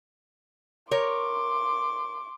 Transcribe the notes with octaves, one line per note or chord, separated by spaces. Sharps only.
A#4 C#5 C6 D6